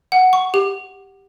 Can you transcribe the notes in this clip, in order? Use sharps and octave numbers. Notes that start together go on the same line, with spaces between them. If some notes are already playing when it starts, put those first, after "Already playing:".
F#5
C#6
G4